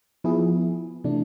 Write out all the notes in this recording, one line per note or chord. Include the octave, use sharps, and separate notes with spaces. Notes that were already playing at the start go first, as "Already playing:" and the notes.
F3 B3 E4 G#4
C3 E3 A3 D4